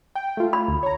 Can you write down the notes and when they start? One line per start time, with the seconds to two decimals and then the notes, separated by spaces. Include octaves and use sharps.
0.15 G5
0.37 A3 F4
0.53 B5
0.68 D2
0.83 C#5 A#5